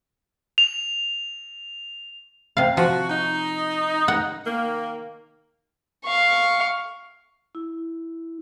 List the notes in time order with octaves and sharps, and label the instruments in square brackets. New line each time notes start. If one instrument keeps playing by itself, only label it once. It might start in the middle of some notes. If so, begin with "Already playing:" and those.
[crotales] F7
[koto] C3 F5
[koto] F3 [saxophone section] F#4
[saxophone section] D#4
[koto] F#5
[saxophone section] D#3 A#3
[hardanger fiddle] F5 C#6
[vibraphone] E4